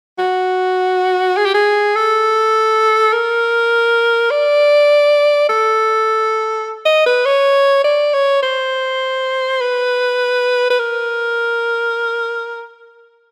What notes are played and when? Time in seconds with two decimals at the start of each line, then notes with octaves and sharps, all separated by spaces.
0.19 F#4
1.37 G#4
1.45 G4
1.54 G#4
1.96 A4
3.13 A#4
4.31 D5
5.49 A4
6.85 D#5
7.06 B4
7.25 C#5
7.84 D5
8.14 C#5
8.43 C5
9.61 B4
10.70 B4
10.79 A#4